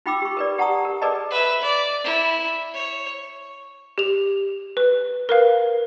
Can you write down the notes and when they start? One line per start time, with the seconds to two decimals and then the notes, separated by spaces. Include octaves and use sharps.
0.06 D#4 F4 G5 B5 D6 E6
0.22 G4 C#6
0.37 A#4 B4 D5
0.58 G4 F#5 A5 A#5 C#6 D#6
0.85 A#4
1.01 G#4 A#4 B4 D5 D#5 A5
1.30 B4 E5
1.61 D5
2.04 E4
2.74 C#5
3.98 G4 F7
4.77 B4
5.29 A#4 B4 F5